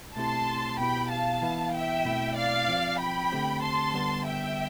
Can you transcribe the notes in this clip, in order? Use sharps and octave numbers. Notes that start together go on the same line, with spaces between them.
B2 A3 C4 E4 G4 A5 C6
B2 B3 E4 G4 G5 B5
F5 A5
E3 B3 E4
E5 G5
B2 A3 C4 E4
D5 F5
F3 C4 F4
G5 B5
D3 A3 C4 G4
A5 C6
D3 G3 B3
E5 G5